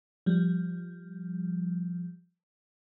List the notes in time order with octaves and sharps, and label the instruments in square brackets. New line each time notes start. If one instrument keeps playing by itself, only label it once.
[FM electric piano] F3 G3